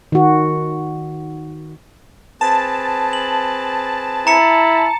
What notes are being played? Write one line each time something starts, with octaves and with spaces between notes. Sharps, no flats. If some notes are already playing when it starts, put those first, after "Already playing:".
D#3 F#4
C4 G#4 B4 A5
F#7
E4 A#5 C#7